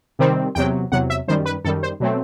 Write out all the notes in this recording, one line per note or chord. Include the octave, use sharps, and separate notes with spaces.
C3 D#3 G3 C4
E2 C3 F#3 G5
E2 C3 F#3 F#5
E5
F#2 D#3 G3 C5
B4
F#2 D#3 G3 A4
C5
B2 F#3 A3 C4